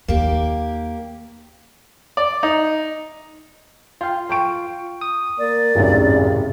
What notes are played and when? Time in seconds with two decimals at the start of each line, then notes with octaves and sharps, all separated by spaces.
0.08 D#2 A#3 G4
2.17 D5
2.43 D#4
4.01 F4 F5 G5
4.29 G5 C#6 D7
5.01 D#6
5.39 A#3 D5
5.75 G#1 C#2 F#2 A2 C3 G#4